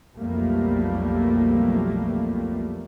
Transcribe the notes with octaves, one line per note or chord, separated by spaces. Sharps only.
B1 F2 G3 A3 A#3